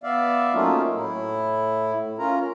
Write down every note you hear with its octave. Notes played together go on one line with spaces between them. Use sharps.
B3 D5 E5 F5
F#3 A3 A#3 C#4 D#4 F4
A2 E4
C#4 F4 A#4 A#5